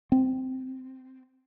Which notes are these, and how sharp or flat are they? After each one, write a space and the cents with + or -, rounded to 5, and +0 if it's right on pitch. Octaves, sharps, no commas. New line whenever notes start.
C4 -10